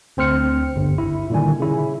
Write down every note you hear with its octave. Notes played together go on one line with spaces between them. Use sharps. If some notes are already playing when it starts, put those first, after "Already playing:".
D2 C4 C5 F6 C#7
G1
E4
A#2 D3 D#3 G3 G#5
C#3 E4